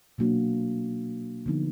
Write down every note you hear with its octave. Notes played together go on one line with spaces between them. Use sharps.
B2 F#3 A#3 D4 F#4
D3 F3 B3 D#4